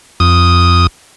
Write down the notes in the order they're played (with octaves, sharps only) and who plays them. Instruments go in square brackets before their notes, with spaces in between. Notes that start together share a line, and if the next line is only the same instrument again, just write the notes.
[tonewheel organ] F2 D#6